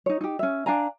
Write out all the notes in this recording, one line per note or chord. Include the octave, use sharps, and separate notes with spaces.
D#4 C#5
D#4 G4
C#4 E5
D4 F5 G#5 A#5